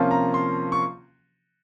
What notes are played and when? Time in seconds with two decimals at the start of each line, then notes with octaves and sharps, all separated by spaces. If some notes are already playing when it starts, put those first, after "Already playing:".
Already playing: C3 F3 A#3 C#4 F4 A5
0.11 A#5
0.34 C6
0.72 C#6